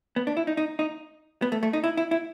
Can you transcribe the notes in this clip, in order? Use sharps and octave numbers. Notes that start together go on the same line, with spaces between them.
B3
D4
E4
D#4
D#4
D#4
B3
A3
A3
D#4
E4
E4
E4